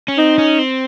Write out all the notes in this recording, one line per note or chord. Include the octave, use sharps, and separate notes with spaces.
C#4
C4 D#4
C#4
C4